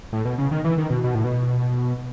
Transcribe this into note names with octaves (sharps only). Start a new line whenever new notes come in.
A2
B2
C#3
D#3
E3
D#3
B2
B2
A2
B2